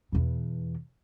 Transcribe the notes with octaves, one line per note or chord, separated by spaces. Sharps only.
E2 B2